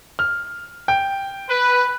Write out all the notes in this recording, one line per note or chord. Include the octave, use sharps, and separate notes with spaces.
F6
G5
B4